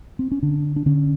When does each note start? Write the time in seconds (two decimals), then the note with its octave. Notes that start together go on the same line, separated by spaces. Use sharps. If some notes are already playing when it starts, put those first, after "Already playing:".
0.19 C4
0.32 C#4
0.43 D3 D4
0.76 D4
0.86 D3 C#4